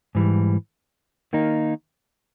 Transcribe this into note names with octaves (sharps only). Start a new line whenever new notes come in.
G#2 E3 G3
D#3 A#3 D#4